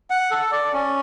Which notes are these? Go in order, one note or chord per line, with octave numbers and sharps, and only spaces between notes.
F#5
A4
D5
C#4